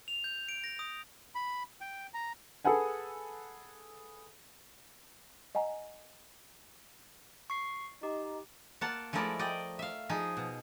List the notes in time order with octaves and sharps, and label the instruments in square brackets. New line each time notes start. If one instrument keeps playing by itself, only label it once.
[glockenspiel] F7
G6
D7
A#6
D#6
[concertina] B5
G5
A#5
[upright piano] G#4 A4 B4 F#5 G#5
[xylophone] D#5 F#5 G#5 A#5
[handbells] C#6 C7
[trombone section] D#4 [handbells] G4
[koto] A#3 F4 F#5 A5
F3 G#3 A3 E4 A#4 D5
D5 D#5 G5
E5 F5
F3 D#4 G#4
B2